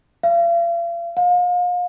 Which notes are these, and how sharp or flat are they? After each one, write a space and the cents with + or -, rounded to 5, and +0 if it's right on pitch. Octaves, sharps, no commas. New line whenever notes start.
F5 -40
F5 +35